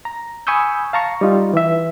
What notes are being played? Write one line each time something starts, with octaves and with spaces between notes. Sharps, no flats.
A#5
G#5 B5 C#6 D#6 E6 G6
F5 A5 A#5 C#6
G3 D#4 F4
E3 E5